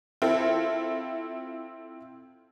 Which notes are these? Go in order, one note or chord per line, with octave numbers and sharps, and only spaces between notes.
C4 E4 F4 A4